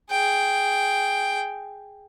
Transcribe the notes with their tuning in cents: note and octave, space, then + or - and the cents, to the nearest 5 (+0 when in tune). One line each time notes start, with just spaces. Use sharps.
G#4 +0 G5 +0